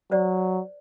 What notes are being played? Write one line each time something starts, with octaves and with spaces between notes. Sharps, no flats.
F#3 C5 D5